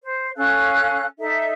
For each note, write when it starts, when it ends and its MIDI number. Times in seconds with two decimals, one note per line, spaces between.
0.03 0.30 72
0.36 1.04 61
0.36 1.04 69
0.36 1.04 77
0.36 1.04 90
1.19 1.53 63
1.19 1.53 69
1.19 1.53 76